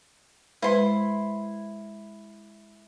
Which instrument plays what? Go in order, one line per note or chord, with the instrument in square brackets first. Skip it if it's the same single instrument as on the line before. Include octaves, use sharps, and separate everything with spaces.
[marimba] G#3 B4 C5 [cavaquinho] E4 C6